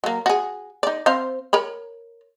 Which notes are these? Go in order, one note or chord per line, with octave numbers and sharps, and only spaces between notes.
F#3 A#3
F#4 G#4
D#4 D5
C4 C5 F5
A#4 C#5 B5